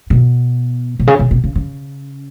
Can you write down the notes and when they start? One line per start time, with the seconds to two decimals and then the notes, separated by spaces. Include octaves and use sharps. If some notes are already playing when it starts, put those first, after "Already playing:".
0.10 B2
0.99 B2
1.07 C#3
1.19 B2
1.31 B2
1.44 C#3
1.55 C#3